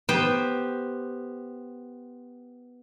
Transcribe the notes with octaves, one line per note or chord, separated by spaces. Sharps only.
B3 G4 C5 G5